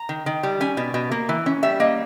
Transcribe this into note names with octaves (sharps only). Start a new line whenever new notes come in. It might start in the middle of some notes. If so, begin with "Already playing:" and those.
Already playing: A#5
D#3
D#3
G3
C#4 G#5
B2
B2
A#3
E3
C#4
G3 E5
A#3 D#5